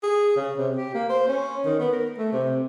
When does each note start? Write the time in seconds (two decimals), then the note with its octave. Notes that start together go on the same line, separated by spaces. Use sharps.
0.03 G#4
0.36 C#3
0.58 C3
0.77 G4
0.94 A#3
1.09 C5
1.28 C#4
1.65 D#3
1.80 B3
1.92 A#4
2.18 A3
2.32 C3